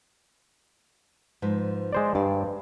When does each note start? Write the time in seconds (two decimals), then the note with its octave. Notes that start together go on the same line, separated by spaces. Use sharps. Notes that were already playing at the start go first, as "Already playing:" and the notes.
1.42 G#2 F3 B4
1.92 G#3 C5 D5
2.15 G2 D5